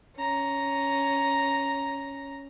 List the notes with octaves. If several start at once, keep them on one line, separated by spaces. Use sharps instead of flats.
C#4 A#5